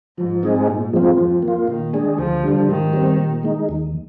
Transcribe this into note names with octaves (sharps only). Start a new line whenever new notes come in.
G#2 F3
G#3 C4 D#4 G#4
A#2
F3 G#3 C4 F4
F2 F3
A#3
F4
A#2 D#3
G#3 D4 G#4
D2 F3
D3 G3
G#2 D#3
G3 C4
A#2
G#3 D#4
D#2